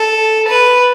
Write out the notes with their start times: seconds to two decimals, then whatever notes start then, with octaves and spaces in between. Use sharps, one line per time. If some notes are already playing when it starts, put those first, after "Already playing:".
Already playing: A4
0.48 B4